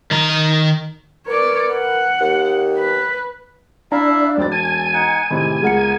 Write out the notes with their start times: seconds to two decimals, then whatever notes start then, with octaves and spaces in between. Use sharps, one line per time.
0.11 D#3 A#5
1.27 A#4 B4 C#5 D5
1.72 F#5
2.20 D#2
2.77 B4
3.92 D4 E4 E5 F5 A#5
4.37 E1 G3 C4 A6
4.52 G#5 A5
4.93 D#4 F#5
5.30 A2 C3 D#3 G#3 B5
5.62 C#2 B3 G#4 A#4 F#5 C#7